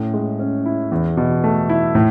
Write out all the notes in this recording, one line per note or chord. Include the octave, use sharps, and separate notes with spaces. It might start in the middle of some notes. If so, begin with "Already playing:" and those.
Already playing: A2 C#4
G#3
C#4
E4
E2
B2
A3
E4
A2